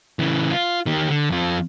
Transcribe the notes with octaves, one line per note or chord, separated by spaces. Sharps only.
C#3 E3
F4
D#3 G4
D3
F2 F4